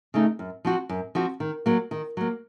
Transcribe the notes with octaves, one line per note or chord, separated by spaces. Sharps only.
C#3 A3 D#4
F#2
F3 C4 F#4
F#2
F3 C4 F#4
D#3
F#3 A#3
D#3
F#3 A#3